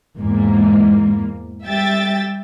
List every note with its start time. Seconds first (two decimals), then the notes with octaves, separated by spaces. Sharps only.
0.16 E2 G#2 A#3
1.64 G3 E5 G5 A6